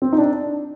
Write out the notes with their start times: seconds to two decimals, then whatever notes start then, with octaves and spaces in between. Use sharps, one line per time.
0.02 C4
0.13 D#4
0.18 D4